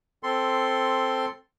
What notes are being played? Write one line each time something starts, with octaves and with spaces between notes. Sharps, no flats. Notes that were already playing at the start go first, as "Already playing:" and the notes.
C4 A4 C6